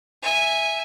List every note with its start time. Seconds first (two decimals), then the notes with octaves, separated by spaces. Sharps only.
0.23 E5 G#5